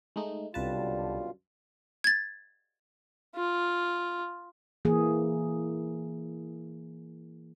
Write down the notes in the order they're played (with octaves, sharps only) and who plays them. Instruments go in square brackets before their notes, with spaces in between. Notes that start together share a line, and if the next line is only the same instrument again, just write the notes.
[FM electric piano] G#3 A3 D#4
[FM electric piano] C2 B4 A5 [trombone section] F#2 D3 G3 [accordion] B2 F4
[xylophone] G#6 A6
[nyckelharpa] F4
[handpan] E3 A#3 G#4